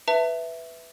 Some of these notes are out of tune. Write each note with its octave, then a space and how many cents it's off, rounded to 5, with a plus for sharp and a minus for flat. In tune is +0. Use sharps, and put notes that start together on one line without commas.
B4 +5 E5 +0 A5 +30